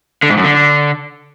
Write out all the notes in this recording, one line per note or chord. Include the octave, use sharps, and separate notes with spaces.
D3
G#2
F#2
D3